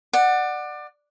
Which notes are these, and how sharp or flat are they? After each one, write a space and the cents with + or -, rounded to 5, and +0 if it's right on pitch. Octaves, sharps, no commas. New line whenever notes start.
D5 +25 F#5 +0